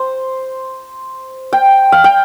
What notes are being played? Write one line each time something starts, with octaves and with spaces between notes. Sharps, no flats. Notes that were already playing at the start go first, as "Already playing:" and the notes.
Already playing: C5
G5
F5
G5